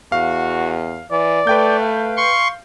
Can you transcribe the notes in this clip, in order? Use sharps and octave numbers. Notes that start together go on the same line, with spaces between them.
E2 F#4 F5
E3 D5
A3 B4 G5 G6
F5
C6 C#6